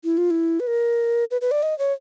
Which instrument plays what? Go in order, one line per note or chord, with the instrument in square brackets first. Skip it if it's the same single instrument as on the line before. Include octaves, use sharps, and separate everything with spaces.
[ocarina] E4
F4
E4
B4
A#4
B4
B4
D5
D#5
C#5